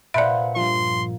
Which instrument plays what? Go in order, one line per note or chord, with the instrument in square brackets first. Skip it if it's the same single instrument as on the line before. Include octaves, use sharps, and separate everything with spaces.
[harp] A#2 [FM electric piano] B4 C5 F#5 [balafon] D5 E5
[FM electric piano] G2 F3 [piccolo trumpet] C6